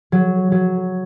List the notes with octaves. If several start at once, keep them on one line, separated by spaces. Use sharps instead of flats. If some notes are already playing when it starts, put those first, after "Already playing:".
F#3
F#3